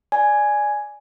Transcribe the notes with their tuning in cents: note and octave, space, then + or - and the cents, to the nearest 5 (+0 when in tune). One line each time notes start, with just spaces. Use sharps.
D5 +0 G#5 +0